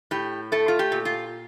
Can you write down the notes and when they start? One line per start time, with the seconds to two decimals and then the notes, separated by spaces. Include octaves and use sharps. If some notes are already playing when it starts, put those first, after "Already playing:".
0.11 A2 G4
0.52 A3 A4
0.68 F4
0.79 G4
0.92 A#2
1.05 F4